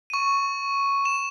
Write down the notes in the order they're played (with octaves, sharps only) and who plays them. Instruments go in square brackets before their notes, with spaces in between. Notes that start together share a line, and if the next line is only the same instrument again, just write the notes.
[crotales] C#6 D#7
E7